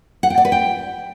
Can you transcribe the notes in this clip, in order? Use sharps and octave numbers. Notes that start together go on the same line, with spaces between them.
F#5
G5
D5
B4
G5